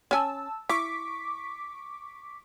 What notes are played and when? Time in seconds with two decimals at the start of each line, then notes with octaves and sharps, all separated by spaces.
0.11 C#4 G#5 A5 E6
0.69 E4 C#6 D6 B6